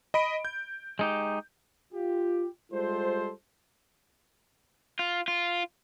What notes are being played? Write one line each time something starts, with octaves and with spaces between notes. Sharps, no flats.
D#5 B5 D7
G6
G#3 D#4 G4
F4 G4
G3 G#3 F4 A4 C5
F4
F4